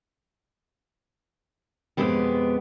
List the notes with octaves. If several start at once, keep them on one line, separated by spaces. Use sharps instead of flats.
F2 G#2 B2 G#3 B3 G4